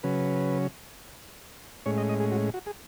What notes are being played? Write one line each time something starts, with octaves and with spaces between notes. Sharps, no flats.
C#3 F#3 C#4 B4
A2 G#3 C#4 C#5
D#5
D#5
G#4
F#4
F#4
G#4